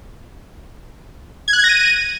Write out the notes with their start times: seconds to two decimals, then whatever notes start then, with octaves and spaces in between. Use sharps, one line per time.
1.48 G#6
1.53 F#6
1.58 G#6
1.64 A#6
1.69 D#7